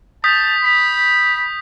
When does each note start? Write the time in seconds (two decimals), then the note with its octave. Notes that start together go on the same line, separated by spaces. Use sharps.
0.24 A5 D#6 G6 B6
0.64 B5